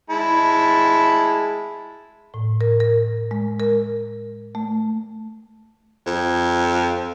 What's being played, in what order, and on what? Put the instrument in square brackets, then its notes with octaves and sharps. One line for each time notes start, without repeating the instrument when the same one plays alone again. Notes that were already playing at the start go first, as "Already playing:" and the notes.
[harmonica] G#3 E4 A5
[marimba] A2
A#4
A#4
G#3
A#4
A3
[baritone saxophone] F2